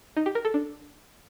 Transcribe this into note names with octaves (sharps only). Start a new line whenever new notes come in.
D#4
G4
A#4
A4
D4